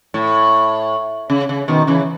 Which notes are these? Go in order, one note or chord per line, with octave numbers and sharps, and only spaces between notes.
A2
C#3
C#3
B2 D#3
C#3 E3